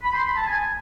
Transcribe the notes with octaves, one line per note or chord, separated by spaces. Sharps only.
B5
C6
B5
A5
G#5